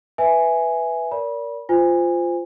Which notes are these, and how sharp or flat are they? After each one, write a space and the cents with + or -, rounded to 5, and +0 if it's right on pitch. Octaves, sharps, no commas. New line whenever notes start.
B4 +0 E5 +0 G#5 +0
A#4 +0 D5 -30 B5 -30
F4 -5 C5 -20 G#5 -25